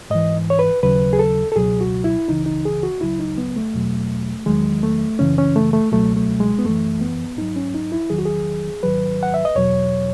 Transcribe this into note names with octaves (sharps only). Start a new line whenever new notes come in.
G#2 E3 D#5
C#5
B4
D#2 C#3 F#3 B4
G#4
A4
A4
C#2 B2 F#3 G#4
F#4
E4
C#2 C#3 E3 D#4
D#4
G#4
F#4
C#2 C#3 F#3 E4
D#4
B3
A3
E2 B2 F#3
E2 D#3 F#3 G#3
A3
F#2 C#3 E3 C#4
C#4
A3
A3
C#2 B2 F#3 A3
A3
G#3
B3
F#2 E3 A3
B3
G#2 F#3 D#4
C#4
D#4
E4
E2 D#3 F#3 G#4
F#4
G#4
G#2 D#3 F#3 B4
F#5
E5
D#5
E2 B2 F#3 C#5